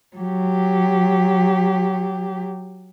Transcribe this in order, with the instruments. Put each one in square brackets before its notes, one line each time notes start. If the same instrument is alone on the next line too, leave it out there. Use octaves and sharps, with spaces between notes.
[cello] F#3 G4